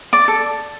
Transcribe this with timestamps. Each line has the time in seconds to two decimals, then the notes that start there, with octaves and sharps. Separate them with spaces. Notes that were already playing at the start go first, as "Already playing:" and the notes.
0.13 D5 D6
0.28 A4